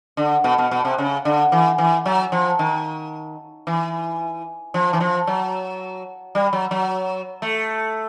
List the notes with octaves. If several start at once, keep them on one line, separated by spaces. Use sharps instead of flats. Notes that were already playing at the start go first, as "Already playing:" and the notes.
D3
B2
B2
B2
C3
C#3
D3
E3
E3
F#3
F3
D#3
E3
F3
E3
F3
F#3
G3
F#3
F#3
A3